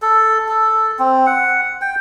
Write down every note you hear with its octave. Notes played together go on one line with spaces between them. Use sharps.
A4
A4
C4
F#5
G5